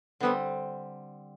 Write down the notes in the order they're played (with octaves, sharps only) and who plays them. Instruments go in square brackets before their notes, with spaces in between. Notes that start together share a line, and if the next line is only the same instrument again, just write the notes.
[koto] D3 G3 C4 [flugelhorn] B3